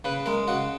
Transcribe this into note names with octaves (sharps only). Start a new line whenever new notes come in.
C#3 B4
G#3 A#4
C#3 F#4